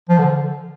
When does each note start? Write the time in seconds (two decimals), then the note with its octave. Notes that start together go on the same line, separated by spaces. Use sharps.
0.09 F3
0.18 D3